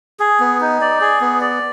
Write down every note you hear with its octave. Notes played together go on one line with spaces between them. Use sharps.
G#4
B3
D#4
D5
G#4
B3
D5